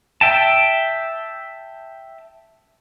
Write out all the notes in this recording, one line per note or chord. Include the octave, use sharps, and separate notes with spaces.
E5 G5 A5